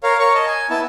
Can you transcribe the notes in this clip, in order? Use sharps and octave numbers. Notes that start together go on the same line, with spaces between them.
A#4 C#5 F5
A#4 C#5 C#6
D#5 A5
G#5
B3 E4 A5